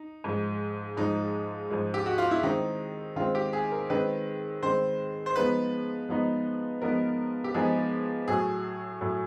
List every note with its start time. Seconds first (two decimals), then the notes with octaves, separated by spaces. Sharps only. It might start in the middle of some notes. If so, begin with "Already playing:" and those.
Already playing: D#4
0.24 G#2 F3 G#3
0.97 G#2 F3 G#3 D#4
1.70 G#2 F3 G#3
1.94 G4
2.06 F#4
2.18 F4
2.31 E4
2.43 D#3 G#3 C4 D#4
3.16 D#3 G#3 C4 F4
3.35 G4
3.53 G#4
3.72 A#4
3.90 D#3 G#3 C4 B4
4.63 D#3 G#3 C4 C5
5.26 C5
5.36 F3 G#3 B3 D#4 B4
6.09 F3 G#3 B3 D#4
6.82 F3 G#3 B3 D#4 A#4
7.44 G4
7.54 F3 G#3 B3 D#4 G#4
8.28 A2 F#3 A3 G#4
9.01 A2 F#3 A3